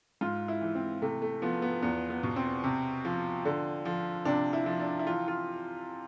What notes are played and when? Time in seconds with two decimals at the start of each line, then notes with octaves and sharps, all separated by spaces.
0.21 G#2 F4
0.48 E4
0.61 E3
0.75 C4
1.02 C3 A3
1.22 A3
1.42 F3 B3
1.62 B3
1.82 E2 B3
2.10 B3
2.23 B2
2.36 C4
2.64 C3
3.05 F3
3.45 D3
3.85 F3
4.25 C3 D4
4.53 E4
4.66 F3
4.80 D4
4.99 E4
5.07 E3 F4
5.28 F4